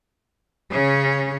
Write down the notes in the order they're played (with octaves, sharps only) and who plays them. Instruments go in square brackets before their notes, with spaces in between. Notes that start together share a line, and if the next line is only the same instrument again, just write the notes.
[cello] C#3 C#4